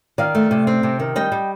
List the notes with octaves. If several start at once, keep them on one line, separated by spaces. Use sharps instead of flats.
D#3 D5 F5
A3
C3
C4
C3
D#3
G3 D#5 G5
G3